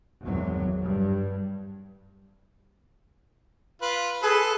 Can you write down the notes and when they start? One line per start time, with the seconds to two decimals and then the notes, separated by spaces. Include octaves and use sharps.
0.23 G#1 E2 F#3
0.86 G2
3.82 F4 B4
4.22 G#4 A4 B4